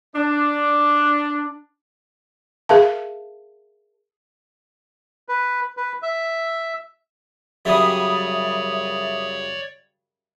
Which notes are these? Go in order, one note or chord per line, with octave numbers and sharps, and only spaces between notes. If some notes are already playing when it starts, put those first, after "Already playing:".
D4
G#4 A#4 E5 F5 A5
B4
B4
E5
F#2 C#3 G3 C#5 D5 E5 D#6